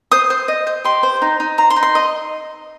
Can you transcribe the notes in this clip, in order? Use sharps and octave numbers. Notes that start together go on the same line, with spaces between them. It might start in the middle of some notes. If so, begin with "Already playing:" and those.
C5 D#6
C5
D#5
C5
G4 C6
C5
D#4
D#4
C5 A#5
C6
D#4
C6
D#5